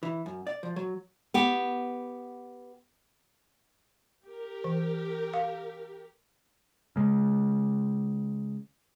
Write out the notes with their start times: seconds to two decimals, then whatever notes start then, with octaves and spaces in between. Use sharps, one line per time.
0.03 E3
0.26 F#2
0.47 D5
0.63 F3
0.76 F#3
1.34 B3 G4
4.28 G4 A#4
4.64 E3
5.34 F5
6.96 C#3 G#3